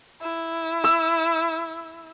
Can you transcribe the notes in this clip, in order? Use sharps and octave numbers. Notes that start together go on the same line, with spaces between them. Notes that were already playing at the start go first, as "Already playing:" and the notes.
E4
E6